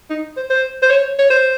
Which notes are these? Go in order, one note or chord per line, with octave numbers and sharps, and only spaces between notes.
D#4
C5
C5
C5
C#5
C#5
C5